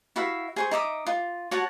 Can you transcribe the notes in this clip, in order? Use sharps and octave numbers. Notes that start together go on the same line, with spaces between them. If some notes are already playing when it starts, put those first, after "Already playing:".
E4 F#4 E5 F5
G#4 C5 C#6
D#4 E5 D6 D#6
F4
F#4 C#5 F#5 A5